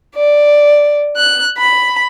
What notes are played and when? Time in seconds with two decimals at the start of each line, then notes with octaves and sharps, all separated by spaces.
0.15 D5
1.17 F#6
1.58 B5